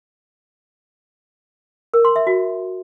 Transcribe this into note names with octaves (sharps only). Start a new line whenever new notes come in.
A#4
C6
E5
F#4